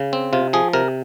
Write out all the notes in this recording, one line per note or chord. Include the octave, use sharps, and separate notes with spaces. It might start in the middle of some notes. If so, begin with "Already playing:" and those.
Already playing: C#3
C4
C3 F4
F3 G#4
C3 A#4